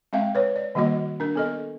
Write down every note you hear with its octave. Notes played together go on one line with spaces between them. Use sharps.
G#3 C4 E5 F5 G5
B4 C#5
D5
D#3 G3 A#3 F#4 D#5
D4 A#4
B3 A4 D#5